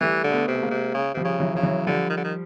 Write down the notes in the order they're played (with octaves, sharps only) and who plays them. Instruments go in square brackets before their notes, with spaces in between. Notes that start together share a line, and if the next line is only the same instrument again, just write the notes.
[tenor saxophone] E3 [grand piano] G3 A3
[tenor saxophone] D3
[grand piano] A3 B3
[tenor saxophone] C3
[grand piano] A3
G#3 A#3
[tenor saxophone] C3
C#3
[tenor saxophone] C3 [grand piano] F3 G3
[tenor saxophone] C#3
[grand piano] E3 F#3
[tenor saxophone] C#3 [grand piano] F3
[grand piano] E3 F#3
[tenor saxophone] D3 [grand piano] F3 G3
[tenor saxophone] D#3
D3
D#3